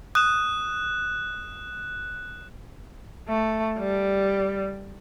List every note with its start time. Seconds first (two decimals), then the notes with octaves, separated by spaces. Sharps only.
0.15 D#6 F#6 E7
3.28 A3
3.78 G3